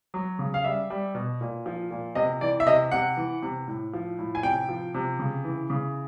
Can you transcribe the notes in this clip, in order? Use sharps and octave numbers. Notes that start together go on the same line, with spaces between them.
F#3
C#3
F5
G3 E5
G3
B2
A#2
F3
A#2
C3 D#5
E3 D5
E5
C3 D#5
C3 F#5
E3
C3
A2
F3
A2
G#5
C3 G5
F3
C3
C#3
E3
C#3